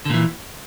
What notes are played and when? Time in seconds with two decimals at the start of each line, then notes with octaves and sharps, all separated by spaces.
0.05 D3
0.10 A#2
0.14 E3